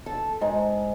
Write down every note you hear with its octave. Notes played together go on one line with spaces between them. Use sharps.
A4
G#2